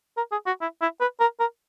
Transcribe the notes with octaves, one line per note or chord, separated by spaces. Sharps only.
A#4
G#4
F#4
E4
E4
B4
A#4
A#4